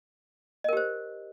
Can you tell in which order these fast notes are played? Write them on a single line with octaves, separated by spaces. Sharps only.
D#5 A#4 G4 C5